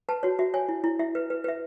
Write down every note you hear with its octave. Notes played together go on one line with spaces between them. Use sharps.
B4 A5
F#4 C#5
F#4 E5
C#5 G#5
E4
E4
E4 E5
B4
B4
B4 E5